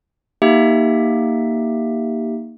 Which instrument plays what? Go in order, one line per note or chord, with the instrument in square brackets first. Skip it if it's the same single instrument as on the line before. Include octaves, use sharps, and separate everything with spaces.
[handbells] A#3 D#4 G4 E5